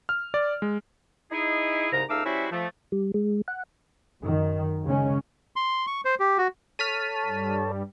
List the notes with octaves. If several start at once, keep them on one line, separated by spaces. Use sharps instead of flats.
F6
D5
G#3
D#4 E4 G#4
C2 G#2 C#3 A#5
C#2 A3 D#4 F5 D6 E6
G3 C#4 E4 F#4 C5 E5
F3 A3
G3
G#3
F#5
F#2 D#3
C#3 G#3 C#4
C6
C#6
C5
G4
F#4
A4 C#5 A5 F6 B6 D#7
G2 G3